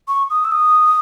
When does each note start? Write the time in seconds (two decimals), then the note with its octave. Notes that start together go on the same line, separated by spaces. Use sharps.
0.08 C#6
0.30 D#6
0.45 E6
0.52 D#6